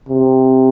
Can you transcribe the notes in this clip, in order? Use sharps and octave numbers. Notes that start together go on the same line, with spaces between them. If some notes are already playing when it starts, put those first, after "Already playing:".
C3